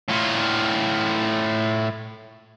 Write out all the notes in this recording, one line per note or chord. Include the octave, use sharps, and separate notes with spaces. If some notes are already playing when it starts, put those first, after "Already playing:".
A2 F4